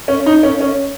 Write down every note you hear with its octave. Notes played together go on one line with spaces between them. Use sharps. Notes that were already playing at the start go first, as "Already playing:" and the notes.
C#4
D#4
C#4
C#4